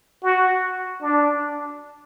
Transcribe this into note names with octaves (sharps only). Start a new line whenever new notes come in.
F#4
D4